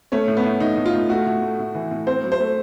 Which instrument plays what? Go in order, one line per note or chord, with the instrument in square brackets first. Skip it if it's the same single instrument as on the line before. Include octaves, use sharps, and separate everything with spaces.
[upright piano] A3 [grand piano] C#4
[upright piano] A2
[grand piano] B3
[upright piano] A2
[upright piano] A2 [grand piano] D#4
[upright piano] A2
[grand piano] F4
[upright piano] A2
[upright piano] A3 [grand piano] F#4
[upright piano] A2
A3
A2
E3
A2
[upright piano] C4 [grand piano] C5
[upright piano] F#3
[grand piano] C5
[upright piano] A3